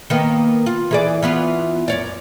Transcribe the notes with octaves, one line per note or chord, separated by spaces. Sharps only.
D#3 A#3 B3
F4
E3 G#4 D5
E3 B3 F4
F#2 C#5 D5